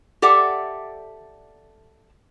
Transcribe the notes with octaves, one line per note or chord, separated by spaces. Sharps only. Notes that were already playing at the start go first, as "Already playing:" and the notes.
G4 A4 D5 E5 F#5